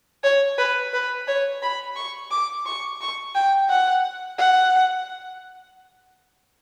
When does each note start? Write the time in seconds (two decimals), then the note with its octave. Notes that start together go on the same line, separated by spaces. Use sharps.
0.24 C#5
0.58 B4
0.93 B4
1.28 C#5
1.62 B5
1.96 C#6
2.31 D6
2.66 C#6
3.01 C#6
3.35 G5
3.69 F#5
4.38 F#5